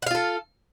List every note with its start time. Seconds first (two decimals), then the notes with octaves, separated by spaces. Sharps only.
0.02 F#5
0.07 F5
0.11 F4
0.15 A4